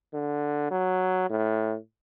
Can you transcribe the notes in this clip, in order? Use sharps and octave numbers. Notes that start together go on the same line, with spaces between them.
D3
F#3
A2